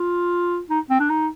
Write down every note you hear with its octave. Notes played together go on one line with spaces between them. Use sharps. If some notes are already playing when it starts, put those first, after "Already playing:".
Already playing: F4
D#4
C4
D4
D#4